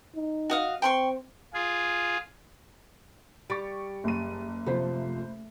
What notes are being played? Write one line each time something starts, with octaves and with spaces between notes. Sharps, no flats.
D#4
F#4 D#5 F5
C4 G5 C6 C#6
F4 G#4
G3 C#6 A6 D7
F#1 D#7
C3 F3 A3 C5 B5